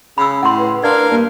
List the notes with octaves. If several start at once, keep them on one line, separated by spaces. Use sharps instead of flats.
C#3 B5 E6
A2 F#5 C6
B4
D4 A#4 D5 F5
G2 A#3